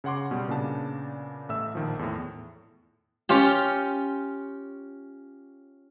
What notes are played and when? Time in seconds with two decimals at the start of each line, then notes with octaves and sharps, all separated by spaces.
0.04 C#3 C#5 F#5 C6 D6
0.31 B2 G3
0.48 A#2 C#3 B3 D4 A5
1.49 A1 A3 E5 E6
1.75 A#1 D#3 F3
1.99 E2 A2
3.29 C#4 F4 G4